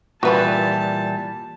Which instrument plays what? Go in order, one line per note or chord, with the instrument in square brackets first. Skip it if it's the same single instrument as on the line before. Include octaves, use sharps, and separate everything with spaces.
[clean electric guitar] A#2 E3 G3 [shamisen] F#4 B4 B5 [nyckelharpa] A5